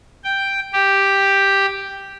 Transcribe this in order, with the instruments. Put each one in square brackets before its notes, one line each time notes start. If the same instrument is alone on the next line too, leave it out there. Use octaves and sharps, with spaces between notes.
[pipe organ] G5
G4